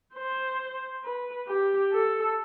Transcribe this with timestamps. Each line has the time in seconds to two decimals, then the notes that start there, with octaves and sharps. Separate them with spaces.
0.15 C5
1.04 B4
1.48 G4
1.93 A4